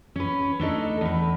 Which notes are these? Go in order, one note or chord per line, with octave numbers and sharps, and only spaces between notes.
C#4 B4
A3 D4 D#4 A4
E2 B4